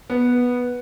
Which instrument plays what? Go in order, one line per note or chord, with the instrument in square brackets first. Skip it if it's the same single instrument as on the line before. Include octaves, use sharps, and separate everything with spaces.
[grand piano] B3